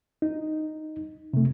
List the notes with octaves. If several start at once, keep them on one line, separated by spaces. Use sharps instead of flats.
D#4
C3 A3